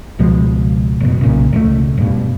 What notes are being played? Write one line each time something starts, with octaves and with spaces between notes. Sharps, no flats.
C#2 B2 F3 G#3
F#1 B2
B1 A#2 C#3
E1 C#2 A3
E1 G2 B2